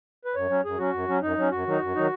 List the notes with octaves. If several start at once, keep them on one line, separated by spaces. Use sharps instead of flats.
B4
F#2 C#5
F#3 C#4
F#2 G#4
F#3 C#4 F#4
F#2
F#3 C#4
F#2 D#4
F#3 C#4
F#2 F#4
D#3 F#3 D#4
F#2
D#3 F#3 D#4